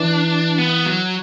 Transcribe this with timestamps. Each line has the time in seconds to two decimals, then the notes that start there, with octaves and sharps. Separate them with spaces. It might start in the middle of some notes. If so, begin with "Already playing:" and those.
Already playing: E3 D4
0.58 B3
0.86 F#3